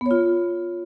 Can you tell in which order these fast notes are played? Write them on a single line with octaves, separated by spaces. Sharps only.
B3 C#5 F4